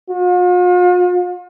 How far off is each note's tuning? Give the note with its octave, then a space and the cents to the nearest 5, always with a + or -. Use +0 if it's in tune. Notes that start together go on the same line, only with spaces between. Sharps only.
F4 +45